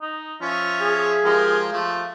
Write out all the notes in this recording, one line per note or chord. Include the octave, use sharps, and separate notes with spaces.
D#4
F3 C#4 F4 E5
G#4
F3 G#3 G4 A#4
F3 A3